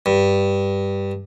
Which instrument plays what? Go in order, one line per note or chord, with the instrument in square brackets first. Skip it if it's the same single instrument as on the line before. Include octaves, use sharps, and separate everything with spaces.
[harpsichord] G2